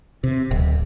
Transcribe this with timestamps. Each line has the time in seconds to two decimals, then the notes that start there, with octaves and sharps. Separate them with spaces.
0.24 C3
0.51 D1